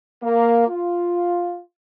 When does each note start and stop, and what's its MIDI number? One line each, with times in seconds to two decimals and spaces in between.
0.23 0.67 58
0.68 1.61 65